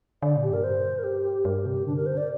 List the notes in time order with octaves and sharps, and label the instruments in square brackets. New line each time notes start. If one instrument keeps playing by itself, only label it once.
[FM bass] D3 [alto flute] D5
[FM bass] A#2
[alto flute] G4
[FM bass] G2 [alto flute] A#4
[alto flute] C5
A#4
G4
[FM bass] G2 [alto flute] A#4
[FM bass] C3 [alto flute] G4
[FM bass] D3 [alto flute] D4
[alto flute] A#4
C5
D5